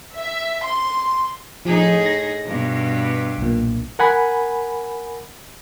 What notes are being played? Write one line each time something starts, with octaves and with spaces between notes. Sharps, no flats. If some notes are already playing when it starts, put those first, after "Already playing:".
E5
C6
A2 F3 D#4 G#4
A#6
G2 B2
B1 A#2
A#4 F#5 G#5 B5